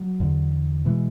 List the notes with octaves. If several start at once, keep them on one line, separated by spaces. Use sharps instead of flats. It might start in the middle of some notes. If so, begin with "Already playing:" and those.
Already playing: F#3
E2 D3
B2 E3 G#3